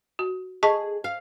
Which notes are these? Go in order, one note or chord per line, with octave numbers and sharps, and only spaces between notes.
F#4
G#4 D#5 A5 C#6
F5